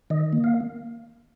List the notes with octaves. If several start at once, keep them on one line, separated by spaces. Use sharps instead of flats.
D#3 D#5
A#3
F5